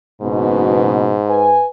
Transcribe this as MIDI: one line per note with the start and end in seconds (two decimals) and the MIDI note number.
0.22 1.16 30
0.22 1.62 44
0.22 1.16 47
1.27 1.65 71
1.27 1.65 80